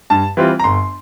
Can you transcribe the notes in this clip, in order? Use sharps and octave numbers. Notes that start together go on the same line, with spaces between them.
G2 A5
E3 G3 C4 F4
A#5
G1 C6